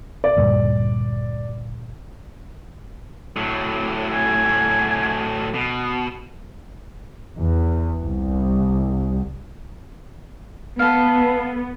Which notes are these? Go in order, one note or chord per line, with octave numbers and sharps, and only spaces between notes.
D5
D2 G2 A#2
A2 F#3
G#5
B2
E2
C2
B3 A4 F5